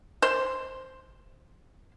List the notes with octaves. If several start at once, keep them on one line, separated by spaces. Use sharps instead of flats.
C5 C6